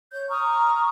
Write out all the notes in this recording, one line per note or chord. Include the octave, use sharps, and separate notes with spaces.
C#5 G6
A#5 C#6 D#6 F6